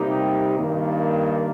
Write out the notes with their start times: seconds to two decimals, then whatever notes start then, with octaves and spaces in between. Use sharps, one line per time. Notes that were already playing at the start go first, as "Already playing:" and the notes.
Already playing: C3 G3 A#3 D#4 G4
0.57 G2 D#3 A#3